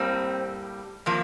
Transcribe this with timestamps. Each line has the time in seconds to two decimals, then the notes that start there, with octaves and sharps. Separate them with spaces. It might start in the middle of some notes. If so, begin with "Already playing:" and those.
Already playing: A2 G3 A#3 C4
1.06 C3 F3 A#3